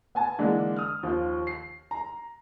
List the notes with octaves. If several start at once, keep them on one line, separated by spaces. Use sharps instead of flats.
B3 G#5 A5
D3 E3 G#3 A#3 D4
D#6 F6
D#2 F3
C7
A#5